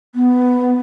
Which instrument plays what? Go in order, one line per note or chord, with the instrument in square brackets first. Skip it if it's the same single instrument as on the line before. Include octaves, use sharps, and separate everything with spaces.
[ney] B3